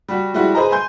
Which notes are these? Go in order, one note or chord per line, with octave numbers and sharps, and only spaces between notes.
G3 F#4
F3 G3 G#3 E4 F#4
G#4 B4 C5 D#5 G#5 A#5
G#5 C6 G6